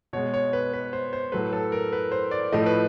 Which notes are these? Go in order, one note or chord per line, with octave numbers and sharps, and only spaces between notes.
B2 G#3 C#5
C#5
B4
B4
C5
C5
A2 F#3 A3 B4
A4
A#4
B4
C5
D5
A2 F3 A3 D#5
B4